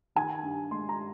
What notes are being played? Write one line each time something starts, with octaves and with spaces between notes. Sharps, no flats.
D#3 G#5
G2
G#3 C6
A#5